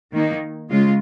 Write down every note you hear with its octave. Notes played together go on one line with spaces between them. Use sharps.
D#3 A#3 D#4
C#3 G#3 F4